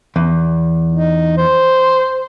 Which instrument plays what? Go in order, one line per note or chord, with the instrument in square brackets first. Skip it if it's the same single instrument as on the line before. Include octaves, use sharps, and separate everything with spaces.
[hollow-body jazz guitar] E2
[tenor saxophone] D#4
C5